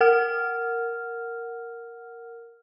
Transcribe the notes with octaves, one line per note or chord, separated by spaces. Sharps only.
A#4 F#5 F6